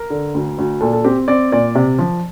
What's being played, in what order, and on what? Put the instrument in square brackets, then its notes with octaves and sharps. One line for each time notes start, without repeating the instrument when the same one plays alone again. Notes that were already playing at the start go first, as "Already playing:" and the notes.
Already playing: [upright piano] A#4
D3
D2
D2
A#2 A4
A4
C4 G4
C4 D5
A#2 D5
C3
F3